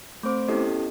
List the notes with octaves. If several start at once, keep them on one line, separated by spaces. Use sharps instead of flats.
A3 C4 C5 D6
B3 C#4 E4 G4 A4 D#5